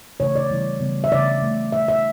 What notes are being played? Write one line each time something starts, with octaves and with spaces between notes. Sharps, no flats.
C#3 E3 A3 C#5
D5
C#3 E3 G3 B3
C#3 E3 G3 B3
E5
C#3 E3 A3 D5
C#3 E3 A3
E3 A3 E5
E5